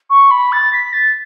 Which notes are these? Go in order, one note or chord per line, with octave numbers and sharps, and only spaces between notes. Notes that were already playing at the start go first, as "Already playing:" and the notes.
C#6
B5
A6
B6
A6